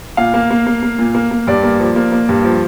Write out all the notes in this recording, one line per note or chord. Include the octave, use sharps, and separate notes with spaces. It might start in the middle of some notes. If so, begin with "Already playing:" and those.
A#2 F5
A#3
A#3
A#3
A#3
A#2
A#3
A#3
G2 D5
A#3
F3
A#3
A#3
G2
F3